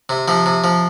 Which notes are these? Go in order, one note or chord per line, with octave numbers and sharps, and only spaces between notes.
C3
C3 F3
C3
F3